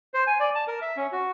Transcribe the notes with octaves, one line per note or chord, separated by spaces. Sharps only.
C5
G#5
D5
A5
A#4
E5
C#4
F#4